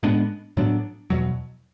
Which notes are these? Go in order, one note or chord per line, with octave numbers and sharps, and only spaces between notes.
A2 G#3 B3 D4
A2 F#3 B3 D4
E2 B2 F#3